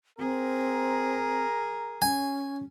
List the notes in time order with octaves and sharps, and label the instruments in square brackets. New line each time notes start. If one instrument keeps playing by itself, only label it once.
[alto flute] C4 [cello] G#4 [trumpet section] A#4 A#5
[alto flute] C#4 [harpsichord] G#5